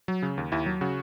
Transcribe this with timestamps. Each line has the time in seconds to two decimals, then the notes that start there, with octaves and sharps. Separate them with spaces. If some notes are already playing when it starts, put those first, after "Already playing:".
0.08 F#3
0.22 C#3
0.38 D#2
0.52 D#2 E4
0.66 F#3
0.81 C#3 F#4